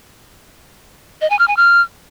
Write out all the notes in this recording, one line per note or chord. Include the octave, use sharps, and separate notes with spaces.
D#5
G#5
F6
G#5
F6